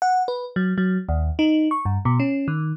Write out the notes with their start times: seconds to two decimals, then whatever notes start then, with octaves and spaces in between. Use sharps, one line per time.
0.02 F#5
0.28 B4
0.56 F#3
0.78 F#3
1.09 D#2
1.39 D#4
1.71 C#6
1.85 G2
2.05 B2
2.20 C#4
2.48 D#3